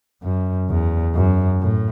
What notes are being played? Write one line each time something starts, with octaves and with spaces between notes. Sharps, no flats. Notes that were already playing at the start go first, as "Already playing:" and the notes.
F#2
E2
F#2
A2